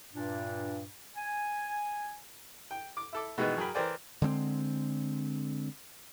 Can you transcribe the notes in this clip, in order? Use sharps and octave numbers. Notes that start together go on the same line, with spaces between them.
G2 A#2 D4
G#5
G5
D6
E4 A4 D6
B2 D#3 E3 G#3
F#3 G#4 A#4 G5 B5
E3 A#4 C5 D5 G5 G#5
D3 G#3 B3 C4